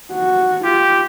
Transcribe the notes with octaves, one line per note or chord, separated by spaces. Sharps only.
F#4
F4 G4